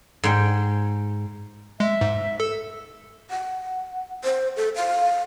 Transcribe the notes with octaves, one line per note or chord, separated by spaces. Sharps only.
G#2 G5
G#3 E5
G#2
A4 E6
F#5
C5
A4
F5